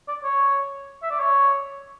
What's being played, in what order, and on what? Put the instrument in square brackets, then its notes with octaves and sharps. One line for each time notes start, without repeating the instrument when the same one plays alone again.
[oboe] D5
C#5
E5
D5
C#5